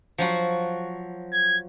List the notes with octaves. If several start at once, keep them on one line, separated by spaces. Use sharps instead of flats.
F3 F#3 F#4
G#6